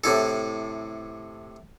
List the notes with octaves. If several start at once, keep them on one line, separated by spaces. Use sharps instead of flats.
A2 C3 E4 A4